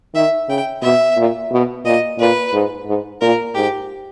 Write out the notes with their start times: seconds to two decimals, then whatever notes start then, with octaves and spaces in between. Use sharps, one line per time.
0.14 D#3 E5
0.49 C#3 G5
0.82 B2 E5
1.17 A#2
1.52 B2
1.85 A#2 D#5
2.19 A#2 B4
2.53 G#2
2.87 G#2
3.21 A#2 A#4
3.55 G#2 G4